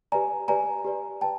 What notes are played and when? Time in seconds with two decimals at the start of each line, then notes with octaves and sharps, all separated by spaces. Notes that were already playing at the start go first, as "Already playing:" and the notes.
0.12 G4 B4 D5 G#5 A#5
0.48 G4 B4 D5 G#5 A#5
0.84 G4 B4 D5
1.21 B4 D5 G5 A5